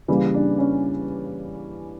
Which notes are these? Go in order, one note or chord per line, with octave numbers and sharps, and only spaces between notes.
C#3 E3 G3 A#3
D4
C#4